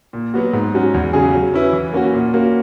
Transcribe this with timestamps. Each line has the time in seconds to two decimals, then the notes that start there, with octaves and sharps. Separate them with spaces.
0.13 A#2
0.34 F#3 B3 F#4
0.53 G#2
0.74 F#3 C#4 F#4
0.94 E2
1.13 C#3 F#3 C#4 G#4
1.34 F#3
1.54 C#4 E4 B4
1.73 E3
1.93 A#3 C#4 F#4
2.14 A#2
2.34 A#3 C#4 F#4